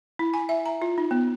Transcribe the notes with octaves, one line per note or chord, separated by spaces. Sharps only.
E4
G#5
E5
A#5
F4
D#4
B3